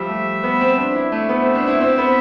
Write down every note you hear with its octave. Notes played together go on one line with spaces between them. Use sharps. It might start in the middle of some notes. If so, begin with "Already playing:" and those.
Already playing: F3 G3 E5
A3
B3
C4
D4
E4
A3
B3 E5
C4
D4
E4
C4
B3